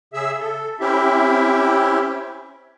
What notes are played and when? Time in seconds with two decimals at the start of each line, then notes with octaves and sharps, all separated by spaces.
0.14 C#3 G#4 E5 E6
0.39 A4
0.80 C4 C#4 E4 G4 E5